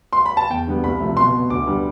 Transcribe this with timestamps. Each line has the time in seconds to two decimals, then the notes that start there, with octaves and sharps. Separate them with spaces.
0.13 C6
0.26 B5
0.37 A5
0.50 E2 G5
0.67 D3 G3 B3
0.84 C2 B5
1.00 C3 F3 A3
1.17 B2 C6
1.34 B3
1.50 D2 D6
1.67 D3 G3 B3